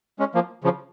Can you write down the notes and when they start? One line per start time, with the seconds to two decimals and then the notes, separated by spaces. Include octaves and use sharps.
0.19 G#3 C#4
0.35 F3 A#3
0.64 C#3 F3